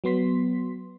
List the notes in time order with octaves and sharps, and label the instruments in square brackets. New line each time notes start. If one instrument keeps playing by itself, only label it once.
[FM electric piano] F#3 B3 C6 B6